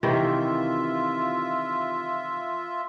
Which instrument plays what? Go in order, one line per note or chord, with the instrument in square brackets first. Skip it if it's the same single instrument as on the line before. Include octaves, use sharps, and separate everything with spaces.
[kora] C3 D#3 E3 [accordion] F4 E5